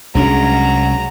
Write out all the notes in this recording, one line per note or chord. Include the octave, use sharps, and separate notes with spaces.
C2 F#3 G#3 C#4 D4 A#5